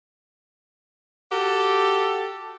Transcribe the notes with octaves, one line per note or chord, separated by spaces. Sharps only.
F#4 G4 A4